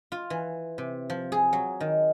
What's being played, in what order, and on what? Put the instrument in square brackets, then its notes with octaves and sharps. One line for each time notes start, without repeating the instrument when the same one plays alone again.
[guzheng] F4
E3
C3
F3
G#4
F#3
D#3